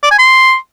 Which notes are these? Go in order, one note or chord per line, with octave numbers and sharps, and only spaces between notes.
D5
G#5
C6